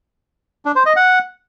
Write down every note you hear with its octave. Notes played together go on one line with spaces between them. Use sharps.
D4
C5
D#5
F#5